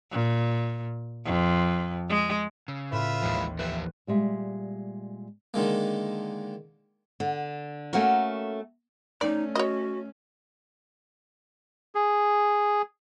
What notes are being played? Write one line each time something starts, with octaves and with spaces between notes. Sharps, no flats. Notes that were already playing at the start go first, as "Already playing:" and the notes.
A#2
F2
G#3
C#3 E6
A2 F4 B4 E5
A1 D#2 E3 F3 G#3
F2 F3 G4 B4 E5
A#2 G3 G#3 E5
D3 D#3 G#3 A#3
D3
A3 A#3 C#4 F#4 A#4
A3 C#4 D#4 D5
F#4 C#5 D#5
G#4